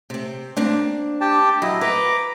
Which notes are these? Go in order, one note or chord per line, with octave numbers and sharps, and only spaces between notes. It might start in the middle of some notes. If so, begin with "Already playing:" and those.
C3 C4
A#3 C4 D4
G4 G5 A5
F#3 E4 D#5
B4 C5 A#5 D6